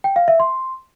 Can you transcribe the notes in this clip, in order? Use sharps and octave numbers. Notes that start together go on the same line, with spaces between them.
G5
F5
E5
C6